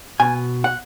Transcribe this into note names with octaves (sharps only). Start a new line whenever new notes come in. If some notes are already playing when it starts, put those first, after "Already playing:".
B2 G#5
F#5